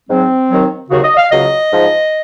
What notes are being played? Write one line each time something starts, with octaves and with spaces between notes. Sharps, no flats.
G#2 F#3 C4
D#2 D#3 F#3
D#2 C#3 F#3 F#4
D#5
F5
C#2 C#3 F#3 D#5
G#2 F3